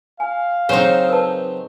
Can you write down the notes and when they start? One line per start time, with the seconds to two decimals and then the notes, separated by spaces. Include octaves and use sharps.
0.20 F5 G#5
0.69 C#3 F#3 C4 D#4 C5
1.09 A#4 B4 A5